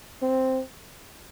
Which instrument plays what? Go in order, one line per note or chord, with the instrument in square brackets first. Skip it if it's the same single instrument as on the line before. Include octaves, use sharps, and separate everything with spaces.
[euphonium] C4